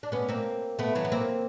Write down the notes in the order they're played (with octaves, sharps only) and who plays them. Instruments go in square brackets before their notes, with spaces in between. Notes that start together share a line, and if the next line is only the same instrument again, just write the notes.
[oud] D4
B3 C#4
A#3 C4
A3 B3
E3 F#3
B3
A#3 C4